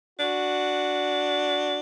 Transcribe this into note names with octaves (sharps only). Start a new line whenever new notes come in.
D4 F#4